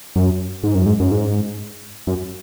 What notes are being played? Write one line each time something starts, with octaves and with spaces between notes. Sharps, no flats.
F#2
G#2
F#2
G#2
F#2
G#2
F#2